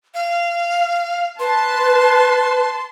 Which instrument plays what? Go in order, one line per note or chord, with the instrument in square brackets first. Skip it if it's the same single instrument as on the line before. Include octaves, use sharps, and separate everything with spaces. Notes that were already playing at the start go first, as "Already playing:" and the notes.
[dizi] F5
[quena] B4 [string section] A5 [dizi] C6